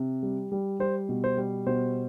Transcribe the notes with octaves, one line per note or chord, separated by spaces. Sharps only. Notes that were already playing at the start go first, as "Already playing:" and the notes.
Already playing: C3
G3
G3
G3 C5
B2
C5
G3
B2 C5